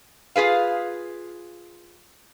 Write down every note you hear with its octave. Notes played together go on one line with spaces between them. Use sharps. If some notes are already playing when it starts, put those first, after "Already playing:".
F4 G#4 B4 F5